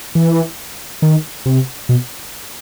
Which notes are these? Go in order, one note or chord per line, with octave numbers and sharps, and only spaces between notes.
E3
D#3
C3
B2